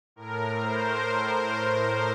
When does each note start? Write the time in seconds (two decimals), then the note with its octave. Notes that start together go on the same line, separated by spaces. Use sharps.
0.16 A2 A#4
0.60 C5